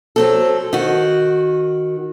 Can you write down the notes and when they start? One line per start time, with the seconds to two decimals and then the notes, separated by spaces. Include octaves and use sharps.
0.16 F#3 C4 A4
0.73 D#3 F#4